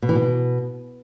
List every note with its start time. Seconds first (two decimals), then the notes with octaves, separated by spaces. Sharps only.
0.02 B2
0.09 E3
0.15 B2